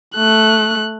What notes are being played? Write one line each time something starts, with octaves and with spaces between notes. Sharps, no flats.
A3 F#6